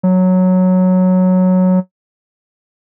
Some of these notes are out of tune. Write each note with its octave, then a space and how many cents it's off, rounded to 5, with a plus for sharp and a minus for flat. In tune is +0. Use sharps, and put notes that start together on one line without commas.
F#3 -5